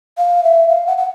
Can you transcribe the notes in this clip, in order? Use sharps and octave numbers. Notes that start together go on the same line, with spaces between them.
F5
E5
F5
F#5
F#5